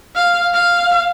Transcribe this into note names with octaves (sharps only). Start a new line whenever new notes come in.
F5
F5